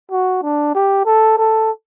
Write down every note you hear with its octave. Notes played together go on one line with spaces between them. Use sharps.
F#4
D4
G4
A4
A4